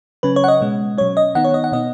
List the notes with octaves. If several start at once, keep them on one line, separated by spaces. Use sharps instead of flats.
C#3 F#3 C#4 B4
C#5
F#5
D#5
B2 G#3 C#4
B2 F#3 C#4 C#5
D#5
D#3 B3 D#4 F#5
C#5
D#5
F#5
B2 B3 D#4 D#5